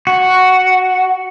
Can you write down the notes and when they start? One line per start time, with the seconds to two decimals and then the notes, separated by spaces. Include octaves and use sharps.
0.07 F#4